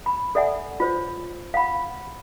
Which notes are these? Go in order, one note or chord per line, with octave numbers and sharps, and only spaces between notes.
B5
A4 D5 E5 F#5 G#5
F4 C5 C#5
F5 F#5 B5